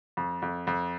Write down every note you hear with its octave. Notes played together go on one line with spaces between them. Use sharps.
F2
F2
F2